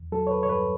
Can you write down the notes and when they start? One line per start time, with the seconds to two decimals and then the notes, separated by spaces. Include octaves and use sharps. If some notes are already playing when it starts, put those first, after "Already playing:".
Already playing: E2
0.12 F#3 A4
0.27 C#5
0.31 B4
0.43 C#5
0.49 G2 B4